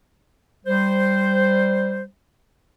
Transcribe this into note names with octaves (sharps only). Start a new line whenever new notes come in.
G3 C5